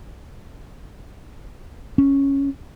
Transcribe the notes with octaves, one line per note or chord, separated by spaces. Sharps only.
C#4